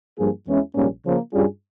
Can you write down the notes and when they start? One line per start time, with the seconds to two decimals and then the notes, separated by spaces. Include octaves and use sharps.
0.18 G2 F3 A#3 F4 G#4
0.47 E2 E3 G#3 C#4 E4
0.75 A#1 G#2 G3 A#3 C#4
1.05 C#3 F3 A#3
1.33 G2 G3 C#4 F4 G#4